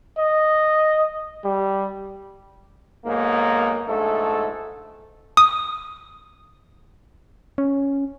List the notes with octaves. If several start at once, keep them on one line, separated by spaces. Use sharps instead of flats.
D#5
G3
B1 G#2 A#3
A#1 G#2 A3 A4
D#6
C#4